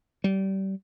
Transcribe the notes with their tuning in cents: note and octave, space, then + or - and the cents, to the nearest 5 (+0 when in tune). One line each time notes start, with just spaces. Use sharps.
G3 -25